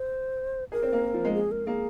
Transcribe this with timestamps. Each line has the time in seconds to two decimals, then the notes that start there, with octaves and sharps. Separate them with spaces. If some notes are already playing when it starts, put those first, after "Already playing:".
Already playing: C5
0.72 G#4 A#4
0.83 C4
0.93 A#3
1.14 F3
1.25 G#3
1.35 G#4
1.51 A#4
1.67 A#3 G#4